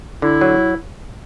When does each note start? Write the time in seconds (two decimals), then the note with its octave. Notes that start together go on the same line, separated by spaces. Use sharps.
0.22 D3 E4
0.41 F#3